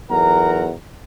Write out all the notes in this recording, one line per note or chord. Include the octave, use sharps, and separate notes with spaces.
B1 E2 A#4 F#5 A#5